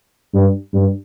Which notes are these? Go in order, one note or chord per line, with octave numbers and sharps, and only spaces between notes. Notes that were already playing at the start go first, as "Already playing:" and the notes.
G2
G2